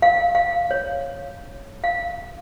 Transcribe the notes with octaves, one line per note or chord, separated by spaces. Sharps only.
F5
F5
C#5
F5